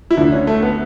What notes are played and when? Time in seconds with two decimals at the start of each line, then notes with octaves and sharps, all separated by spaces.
0.11 E4
0.17 D2 D3 D4
0.32 C#4
0.47 A3
0.63 B3